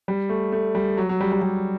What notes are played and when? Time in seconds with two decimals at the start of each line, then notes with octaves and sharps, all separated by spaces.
0.08 G3
0.29 A3
0.52 A3
0.75 G3
0.97 F#3
1.09 F#3
1.20 G3
1.32 G3
1.42 G3